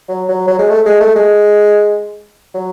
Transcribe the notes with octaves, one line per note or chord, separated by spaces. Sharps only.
F#3
F#3
F#3
G#3
A3
G#3
A3
G#3
F#3